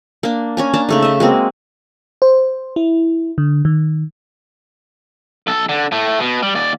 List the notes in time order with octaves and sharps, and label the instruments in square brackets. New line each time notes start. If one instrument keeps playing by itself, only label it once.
[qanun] A#3 D4
C#4 G#5 A#5
A#3 D4 A5 A#5
C#3 A3 D#4
D#5 E5
G#3 A#3 C4 F#4
[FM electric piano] C5
E4
D3
D#3
[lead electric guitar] B1 A4
D3
A2 A3
B2
G3
D#2 D5